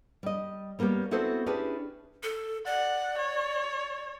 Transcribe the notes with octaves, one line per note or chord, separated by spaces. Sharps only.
G3 D#5
G3 A#3 B3 C#4 G4
B3 C4 E4 F#4 A4 C5
C#4 D4 E4 G4 G#4 B4
A4
D5 F#5
C#5